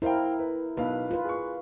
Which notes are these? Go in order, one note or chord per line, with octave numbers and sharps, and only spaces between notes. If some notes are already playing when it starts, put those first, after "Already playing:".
E4 A#4 C5 F5 G5
B4
B1 B4 F5
F4 B4
G#4 C#6